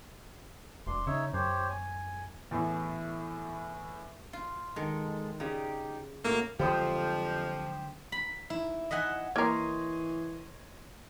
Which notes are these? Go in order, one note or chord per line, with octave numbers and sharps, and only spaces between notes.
E1 D4 C6
C#3 D#4 C#5 E5
F#2 G4 C5 C#5
G#5
E2 A2
F4
D#3 G#3 A4
C#3 D#4 G4 D5
A2 F#3 A#3 F#4
F2 D3 F3 F#3 G#3 G4 C5 D#6
B5
E4
D#5 E5 F#5 G#5
E3 A#3 A#4 C#5 D#5 C6